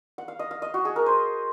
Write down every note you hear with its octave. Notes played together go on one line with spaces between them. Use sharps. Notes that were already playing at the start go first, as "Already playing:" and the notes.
F#5
F5
D#5
F5
D#5
F#4
G#4
A#4
C5